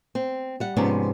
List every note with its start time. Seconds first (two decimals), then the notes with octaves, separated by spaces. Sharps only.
0.15 C4
0.60 G3 F#5
0.77 G#2 C3 F3 B3 C#4 D5